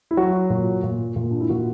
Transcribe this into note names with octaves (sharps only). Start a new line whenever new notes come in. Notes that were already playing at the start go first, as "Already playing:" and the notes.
E4
F#3 F#4
A#2 F#4
A#2
A#2
D4
E4
A#2 F#4